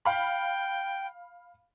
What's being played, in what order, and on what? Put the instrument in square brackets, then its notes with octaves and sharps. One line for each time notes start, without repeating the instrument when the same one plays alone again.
[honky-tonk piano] F5 B5 [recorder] G5